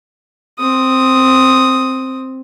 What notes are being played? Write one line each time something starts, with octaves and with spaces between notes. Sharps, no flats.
C4 D#6